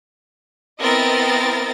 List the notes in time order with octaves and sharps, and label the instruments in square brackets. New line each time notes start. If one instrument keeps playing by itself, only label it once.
[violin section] B3 C4 E4 A#4 D#5 A6